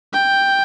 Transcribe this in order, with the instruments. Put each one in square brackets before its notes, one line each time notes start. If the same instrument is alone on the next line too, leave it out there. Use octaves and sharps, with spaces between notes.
[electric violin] G5